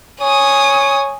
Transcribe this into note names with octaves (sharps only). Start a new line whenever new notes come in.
C#5 G#5 D#6